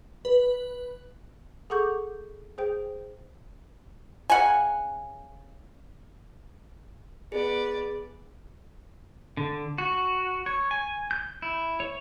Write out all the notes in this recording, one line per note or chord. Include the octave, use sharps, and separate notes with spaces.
B4
G#4 A4 F#5 C#6 D6 G6
G#4 C5 G5
C#3 F#5 G#5
B3 G#4 D5
D3
F#4
C#5
G#5
G6
E4
C#5